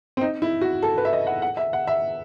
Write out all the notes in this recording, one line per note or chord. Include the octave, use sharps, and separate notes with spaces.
C4
D#4
E4
F#4
A4
B4
E5
D#5
F#5
F#5
E5
F#5
E5